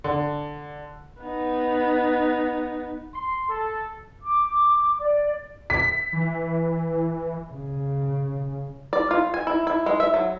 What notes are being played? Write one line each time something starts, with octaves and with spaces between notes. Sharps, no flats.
D3
B3 D#4
C6
A4
D6
D5
B6
E3
C#3
D5
F4
G#5
E4
E4
G#3
E5
F#3